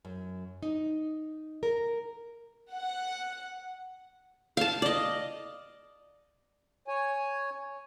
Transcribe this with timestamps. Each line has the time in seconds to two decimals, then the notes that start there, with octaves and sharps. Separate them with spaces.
0.05 F#2
0.63 D#4
1.63 A#4
2.72 F#5
4.57 F5 A5
4.82 D5 D#5
6.88 C#5 G#5